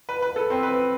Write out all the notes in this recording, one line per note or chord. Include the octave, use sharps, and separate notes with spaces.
B4
B4
A4
C4
B4